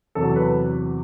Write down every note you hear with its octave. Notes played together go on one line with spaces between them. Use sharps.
E2 C3 F#3 A4
B4